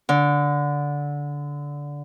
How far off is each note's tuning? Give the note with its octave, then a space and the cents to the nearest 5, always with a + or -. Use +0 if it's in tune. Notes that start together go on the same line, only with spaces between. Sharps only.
D3 -15